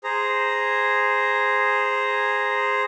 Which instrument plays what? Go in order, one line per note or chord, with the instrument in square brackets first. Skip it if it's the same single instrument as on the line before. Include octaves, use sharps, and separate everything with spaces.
[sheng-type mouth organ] G#4 C5 A#5